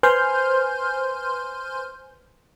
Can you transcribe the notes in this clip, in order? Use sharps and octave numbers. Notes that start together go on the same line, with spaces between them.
B4 C5 G#5 C6 F6 G6